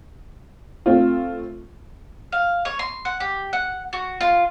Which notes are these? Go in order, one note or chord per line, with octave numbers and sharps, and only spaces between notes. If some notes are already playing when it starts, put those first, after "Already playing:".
A3 C4 F4
F5
C#5
C6
F#5
G4
F#5
F#4
F4